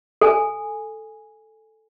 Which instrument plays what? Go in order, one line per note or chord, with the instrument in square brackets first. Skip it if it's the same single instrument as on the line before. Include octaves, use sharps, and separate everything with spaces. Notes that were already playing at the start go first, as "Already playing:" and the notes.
[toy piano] A4 G#5